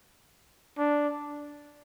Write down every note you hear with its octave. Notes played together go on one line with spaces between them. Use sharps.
D4